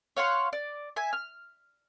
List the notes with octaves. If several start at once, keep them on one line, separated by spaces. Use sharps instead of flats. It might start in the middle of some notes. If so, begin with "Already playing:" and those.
C#5 F5 F#5 C6
D5
E5 G#5
F6